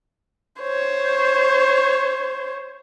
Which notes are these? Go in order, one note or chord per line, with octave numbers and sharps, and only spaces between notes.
C5 C#5